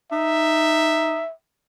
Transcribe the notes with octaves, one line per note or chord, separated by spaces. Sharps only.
D#4 E5